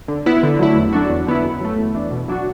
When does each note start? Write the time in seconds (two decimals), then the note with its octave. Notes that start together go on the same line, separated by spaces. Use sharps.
0.08 D3
0.26 B3 E4
0.43 D3
0.59 F#3 A3 E4
0.76 E2
0.93 D3 F#3 D4 F#4
1.10 E2
1.27 D3 B3 E4
1.44 F#2
1.61 F#3 A3
1.78 E2
1.95 E3 D4
2.11 B2
2.28 F#3 D4 F#4